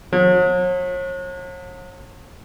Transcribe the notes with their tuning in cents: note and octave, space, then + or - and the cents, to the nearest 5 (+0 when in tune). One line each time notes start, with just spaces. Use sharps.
F#3 -45